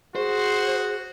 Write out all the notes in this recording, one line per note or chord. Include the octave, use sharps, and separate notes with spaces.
F#4 G#4 C5